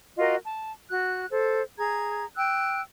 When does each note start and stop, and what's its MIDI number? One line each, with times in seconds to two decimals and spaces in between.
0.17 0.35 65
0.17 0.35 66
0.17 0.35 70
0.17 0.35 75
0.45 0.72 81
0.90 1.25 66
0.90 1.25 90
1.29 1.62 69
1.29 1.62 72
1.77 2.25 68
1.77 2.25 82
1.77 2.25 92
2.37 2.81 79
2.37 2.81 88
2.37 2.81 90